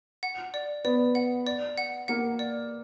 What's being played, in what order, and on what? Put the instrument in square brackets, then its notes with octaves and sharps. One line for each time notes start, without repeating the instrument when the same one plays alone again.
[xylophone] F#5
D5
[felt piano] B3 [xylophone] D5
[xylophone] F#5
D5
F#5
[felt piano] A#3 [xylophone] F#5
[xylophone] D5